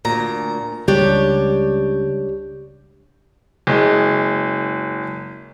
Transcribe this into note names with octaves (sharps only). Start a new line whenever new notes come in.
D2 A#2 A#5
C#2 G3 D4 G4 C#5
F#1 G#3